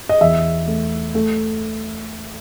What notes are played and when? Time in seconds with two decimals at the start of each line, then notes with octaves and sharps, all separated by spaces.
0.09 D#5
0.21 E2 E5
0.68 A3
1.15 A3